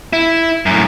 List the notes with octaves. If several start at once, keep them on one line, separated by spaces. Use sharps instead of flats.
E4
F#2 A2